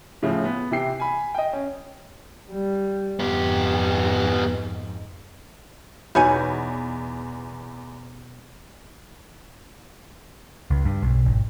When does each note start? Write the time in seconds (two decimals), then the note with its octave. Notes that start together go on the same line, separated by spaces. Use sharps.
0.23 A2 C#3 F3
0.44 B3
0.71 C3 E3 G5 C7
1.00 G#5 B5
1.35 D#5 G5
1.53 C#4
2.51 G3
3.20 F2 G#2 B3 G4
6.15 E2 B2 B3 D#4 C#5 G#5
10.70 C#2
10.85 G2
11.02 B1
11.26 G#1